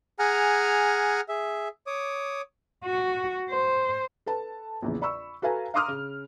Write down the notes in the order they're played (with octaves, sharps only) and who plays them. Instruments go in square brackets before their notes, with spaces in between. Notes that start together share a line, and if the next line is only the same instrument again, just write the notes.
[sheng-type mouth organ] G#4 F#5 G#5 A#5 F6
G#4 E5
C#5 D6 D#6
[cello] F#4
C5
[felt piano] A4 B4 A5
A#1 E2 C#3
D5 B5 C#6 E6
F#4 A4 B4 F5 G#5 A#5
F5 A#5 C6 D6 D#6 F6
C#3